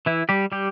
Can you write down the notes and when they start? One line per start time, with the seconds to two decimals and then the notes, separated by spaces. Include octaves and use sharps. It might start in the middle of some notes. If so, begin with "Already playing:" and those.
0.06 E3 E4
0.29 G3 G4
0.52 G3 G4